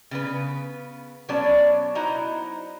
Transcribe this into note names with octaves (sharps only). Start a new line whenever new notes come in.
C#3 B3 B4
B2 F#3 B3 C#4 D5 A5
D#4 E4 F#4 C5 D#5 A#5